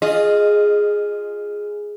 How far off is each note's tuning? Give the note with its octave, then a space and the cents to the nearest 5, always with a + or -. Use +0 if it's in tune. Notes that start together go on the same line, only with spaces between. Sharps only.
F4 +0 G#4 +0 D#5 -20